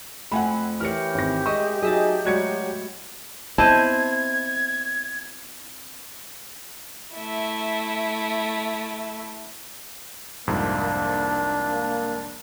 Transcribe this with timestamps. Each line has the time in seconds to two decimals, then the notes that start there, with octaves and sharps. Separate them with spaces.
0.32 F2 A3 F#5 G#5 B5
0.80 E3 E4 G4 A#4 C#5 F6 C#7
1.14 G#1 C4 A#6
1.46 G#3 D#5 E5 C#6
1.82 F#3 D#4 G#4 D#5 E5 A5
2.25 A2 F#3 G#3 F#4 D5 G#6 C#7
3.58 B3 C4 E4 C5 D#5 A5 G#6
7.15 A3 E4
10.47 C2 F2 G#2 A#3 D4